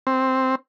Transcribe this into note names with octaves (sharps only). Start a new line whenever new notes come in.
C4